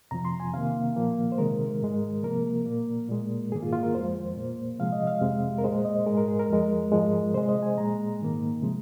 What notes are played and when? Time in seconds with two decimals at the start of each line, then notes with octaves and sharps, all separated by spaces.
0.11 F2 C3 F3 A#5
0.25 C6
0.40 G#5
0.53 C3 D#3 A#3 F5
0.96 A#2 F3 A#3
1.32 C5
1.38 C3 D#3 G#3 A#4
1.82 G#2 G#3
2.23 C3 F3 A#3 A#4
2.66 A#2 A#3
3.09 A#2 G#3
3.52 G#2 D#3 A#3 G#4
3.63 F4
3.73 F4
3.83 A#4
3.94 F2 F3 G#3 C5
4.36 A#2 A#3
4.79 C3 F3 G#3 F5
4.92 D#5
5.07 F5
5.21 F2 C3 G#3
5.58 A#4
5.64 A#2 G#3 C5
5.85 D#5
6.06 G#2 G#3 A#4
6.17 A#4
6.28 G#4
6.39 A#4
6.49 F2 F3 G#3
6.92 G#2 F3 G#3
7.34 C3 G#3 C5
7.49 D#5
7.62 G#5
7.78 A#2 G#3 A#5
8.20 G#2 D#3 A#3
8.62 C3 F3 G#3